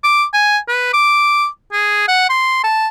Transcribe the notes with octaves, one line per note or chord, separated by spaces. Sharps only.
D6
G#5
B4
D6
G#4
F#5
C6
A5